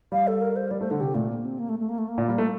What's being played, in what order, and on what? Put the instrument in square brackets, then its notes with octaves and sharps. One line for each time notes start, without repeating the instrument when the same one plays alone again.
[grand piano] G3 [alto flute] F5
[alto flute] A4
A#4
C5
[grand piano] G3 [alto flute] D5
[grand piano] A3 [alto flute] C5
[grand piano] D3 [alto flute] A4
[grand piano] C3 [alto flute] G4
[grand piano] A#2 [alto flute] A3
[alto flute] A#3
C4
A#3
A3
A3
A#3
A3
A#3
[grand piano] A#2
G3
A3